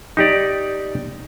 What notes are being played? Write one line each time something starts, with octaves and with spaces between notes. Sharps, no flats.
D#4 G4 D5